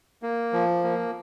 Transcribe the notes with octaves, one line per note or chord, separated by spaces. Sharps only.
A#3
F3
A#3